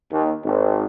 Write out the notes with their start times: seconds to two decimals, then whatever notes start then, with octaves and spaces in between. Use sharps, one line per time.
0.11 D#2
0.44 G#1